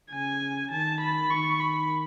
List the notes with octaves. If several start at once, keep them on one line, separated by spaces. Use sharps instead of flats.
C#3 G#5
D#3 A5
B5
D#3 C#6
B5